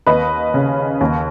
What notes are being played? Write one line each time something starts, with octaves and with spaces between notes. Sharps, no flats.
D#2 B4 D#5
C#3
D#2